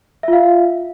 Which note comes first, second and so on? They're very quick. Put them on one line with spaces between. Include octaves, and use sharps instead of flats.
E5 F4 F5